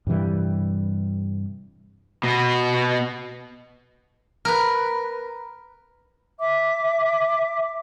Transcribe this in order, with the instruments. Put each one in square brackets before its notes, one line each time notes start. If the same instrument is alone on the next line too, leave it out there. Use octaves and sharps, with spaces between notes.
[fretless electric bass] G2 C3 E3 G3
[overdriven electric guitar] B2 B3
[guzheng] A#4 B4
[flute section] E5 D6